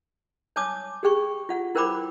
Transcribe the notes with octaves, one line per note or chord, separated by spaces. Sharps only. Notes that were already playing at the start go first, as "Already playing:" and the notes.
C#5 G#5 A5 D6 D#6
G4 G#4 G5 C#6
F4 F#5
E4 A#4 C5 G5 B5 D6